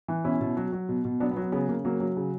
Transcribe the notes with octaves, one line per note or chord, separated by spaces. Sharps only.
E3
B2 C#4 E4
B2
F#3
F#3
B2
B2
F#3 B3 D4
B3
F#3
B3
C#3 B3
C#3 A#3
F#3 A#3
F#3
C#3